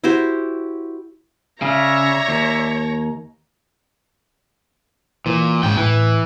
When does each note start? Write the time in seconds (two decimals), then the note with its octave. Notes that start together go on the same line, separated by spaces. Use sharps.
0.04 E4 F#4 G4 C5
1.62 C#3 C#5 D5 E5 A#5
2.28 D#2
5.26 A#2 E3
5.63 G#2 C#3 G5
5.77 A2 E3